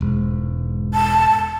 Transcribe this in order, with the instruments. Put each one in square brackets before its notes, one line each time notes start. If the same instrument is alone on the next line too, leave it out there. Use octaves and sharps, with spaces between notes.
[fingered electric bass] E1 G#2
[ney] A5